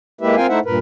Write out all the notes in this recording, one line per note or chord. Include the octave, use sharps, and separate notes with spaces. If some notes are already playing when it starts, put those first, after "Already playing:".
G#3 A#3 E4 G4 B4 E5
C4 F4 A#4 F5 G5 G#5
A3 D#4 E4 C5 E5 F#5
G2 A#2 A#4 B4